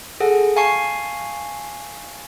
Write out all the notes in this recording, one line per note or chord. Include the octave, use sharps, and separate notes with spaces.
G#4 A4 F#5
F5 G#5 A5 C#6 C7